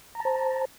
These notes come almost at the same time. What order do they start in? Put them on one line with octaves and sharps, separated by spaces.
A#5 A5 C5